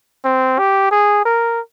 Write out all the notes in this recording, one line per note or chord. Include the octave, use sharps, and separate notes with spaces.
C4
G4
G#4
A#4